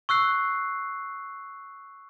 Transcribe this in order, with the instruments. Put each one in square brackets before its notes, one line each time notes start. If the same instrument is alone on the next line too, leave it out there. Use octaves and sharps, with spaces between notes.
[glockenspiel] C#6 E6 F#6 C7